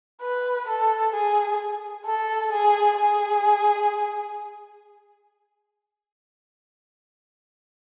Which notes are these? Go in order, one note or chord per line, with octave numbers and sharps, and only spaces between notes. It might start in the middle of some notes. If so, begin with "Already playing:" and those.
B4
A4
G#4
A4
G#4
G#4